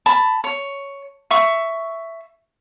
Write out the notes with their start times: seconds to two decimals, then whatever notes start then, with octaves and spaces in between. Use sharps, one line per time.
0.06 A5 B5
0.44 C#5
1.31 E5 C#6